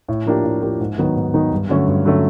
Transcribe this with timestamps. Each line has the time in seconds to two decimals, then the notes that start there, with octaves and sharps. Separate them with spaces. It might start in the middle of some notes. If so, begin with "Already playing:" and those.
0.09 A2
0.26 F3 A#3 D4 G4
0.44 A2
0.62 F3 A#3 D4 G4
0.80 G#2
0.98 D#3 F#3 B3 D#4
1.16 G#2
1.34 D#3 F#3 B3 D#4
1.52 G2
1.69 D3 F#3 A3 C#4
1.88 G2
2.05 D3 F#3 A3 C#4